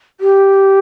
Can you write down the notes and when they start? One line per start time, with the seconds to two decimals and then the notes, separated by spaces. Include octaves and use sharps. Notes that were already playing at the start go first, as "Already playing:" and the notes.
0.20 G4